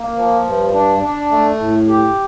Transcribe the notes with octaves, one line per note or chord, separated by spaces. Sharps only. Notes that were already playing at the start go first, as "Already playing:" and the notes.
Already playing: A#3
F3
G2
D4
D4
A3
A2
G4